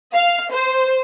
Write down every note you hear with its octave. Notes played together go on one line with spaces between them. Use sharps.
F5
C5